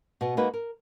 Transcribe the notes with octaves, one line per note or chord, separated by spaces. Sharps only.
B2 B3
G#3 A#3 D#4 F#4 B4
A#4